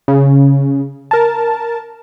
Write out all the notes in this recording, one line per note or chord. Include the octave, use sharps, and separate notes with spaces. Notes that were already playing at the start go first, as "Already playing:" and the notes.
C#3
A#4 A5